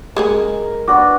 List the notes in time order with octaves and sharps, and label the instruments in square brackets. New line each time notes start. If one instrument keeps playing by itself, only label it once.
[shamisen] G#3 C#4 G#4 [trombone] A#4
[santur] B3 D4 F#4 [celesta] D6